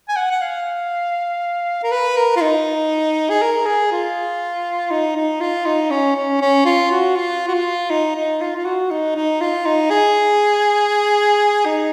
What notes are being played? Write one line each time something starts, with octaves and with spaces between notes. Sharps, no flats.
G#5
F#5
F#5
F5
A#4
B4
A#4
F4
D#4
G#4
A#4
G#4
F4
D#4
D#4
F4
D#4
C#4
C#4
C#4
F4
F#4
F4
F#4
F4
D#4
D#4
F4
F4
F#4
D#4
D#4
F4
D#4
G#4
D#4